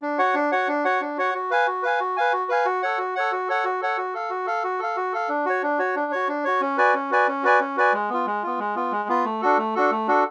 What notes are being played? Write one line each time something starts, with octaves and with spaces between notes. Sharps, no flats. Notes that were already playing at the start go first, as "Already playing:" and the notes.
D4
F#4 C#5 F#5
D4
F#4 C#5 F#5
D4
F#4 C#5 F#5
D4
F#4 C#5 F#5
F#4
B4 F5 G#5
F#4
B4 F5 G#5
F#4
B4 F5 G#5
F#4
B4 F5 G#5
F#4
A4 C#5 F#5
F#4
A4 C#5 F#5
F#4
A4 C#5 F#5
F#4
A4 C#5 F#5
F#4
A4 F5
F#4
A4 F5
F#4
A4 F5
F#4
A4 F5
D4
F#4 C#5
D4
F#4 C#5
D4
F#4 C#5
D4
F#4 C#5
C#4
F#4 B4 D5 G#5
C#4
F#4 B4 D5 G#5
C#4
F#4 B4 D5 G#5
C#4
F#4 B4 D5 G#5
G#3
B3 F4
G#3
B3 F4
G#3
B3 F4
G#3
B3 F4
A3
D4 F#4 A4
A3
D4 F#4 A4
A3
D4 F#4 A4